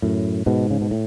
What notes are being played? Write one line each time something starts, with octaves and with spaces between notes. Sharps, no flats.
F#2 A2
G#2 B2
C#3
B2
A2